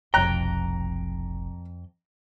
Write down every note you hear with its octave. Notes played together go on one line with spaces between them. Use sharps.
F1 B1 F2 G5 A#5 F#6